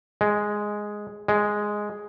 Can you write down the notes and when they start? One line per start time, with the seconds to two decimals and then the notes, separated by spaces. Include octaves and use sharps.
0.21 G#3
1.28 G#3